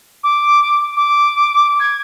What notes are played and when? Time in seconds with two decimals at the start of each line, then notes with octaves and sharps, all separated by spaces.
0.24 D6
0.97 D6
1.80 G#6